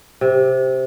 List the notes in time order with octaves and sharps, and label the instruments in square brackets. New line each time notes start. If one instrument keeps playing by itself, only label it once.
[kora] C3